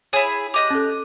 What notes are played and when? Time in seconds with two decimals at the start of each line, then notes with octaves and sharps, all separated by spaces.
0.13 E4 G#4 C#5
0.54 G4 D#5 F#6
0.70 C#4 A4